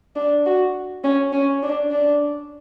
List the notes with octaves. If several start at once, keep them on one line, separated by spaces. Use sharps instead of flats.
D4
F#4
C#4
C#4
D4
D4